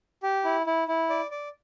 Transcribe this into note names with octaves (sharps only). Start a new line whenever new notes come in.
G4
E4
E4
E4
D5
D5